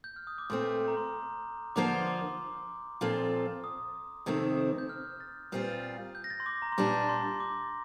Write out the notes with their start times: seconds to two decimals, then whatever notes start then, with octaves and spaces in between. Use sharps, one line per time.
0.04 G6
0.16 F6
0.27 D#6
0.38 D6
0.50 A#2 A3 C4 C6
0.66 D6
0.88 A#5
0.97 C6
1.76 D3 F3 A#3 F4 C5 D6
2.02 C6
2.07 D6
3.01 A#2 F3 C4 F4 A4
3.64 D#6
4.26 F2 C3 D#3 A3 C4
4.78 G6
4.89 F6
5.20 A6
5.52 A#2 G3 C4 F4
6.15 G6
6.24 A#6
6.30 A6
6.40 C6
6.46 D6
6.62 A#5
6.72 C6
6.78 A#2 G3 D4 D6
7.09 C6
7.40 D6